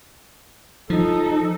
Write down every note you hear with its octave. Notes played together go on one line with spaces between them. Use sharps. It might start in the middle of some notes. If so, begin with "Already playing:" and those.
F3 D#4 A4